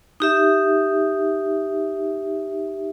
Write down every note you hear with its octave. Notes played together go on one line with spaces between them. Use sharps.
D#4 G4 E5